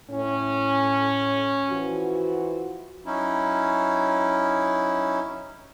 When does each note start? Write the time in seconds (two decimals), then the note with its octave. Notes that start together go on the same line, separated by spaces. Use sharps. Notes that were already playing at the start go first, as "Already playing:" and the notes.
0.10 A2 C#4
1.69 E3 F3 F#4
3.06 F#3 C#4 D#4 E4